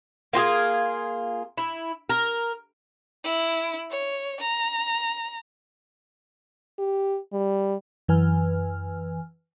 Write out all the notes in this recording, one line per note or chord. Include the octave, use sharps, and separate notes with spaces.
A#3 F4 G4 G#4
E4
A#4
E4
C#5
A#5
G4
G3
F#2 E3 B4 G#5 F6